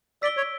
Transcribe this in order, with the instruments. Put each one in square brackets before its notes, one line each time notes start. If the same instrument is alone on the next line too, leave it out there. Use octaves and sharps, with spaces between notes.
[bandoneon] D5 [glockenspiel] E6 B6 D7 G7
[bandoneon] C#5